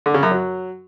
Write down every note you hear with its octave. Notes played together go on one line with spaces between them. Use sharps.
D3
C#3
F#2
F#3